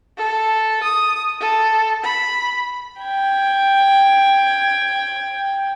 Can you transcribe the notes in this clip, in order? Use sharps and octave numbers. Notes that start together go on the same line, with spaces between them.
A4
D#6
A4
B5
G5 G#6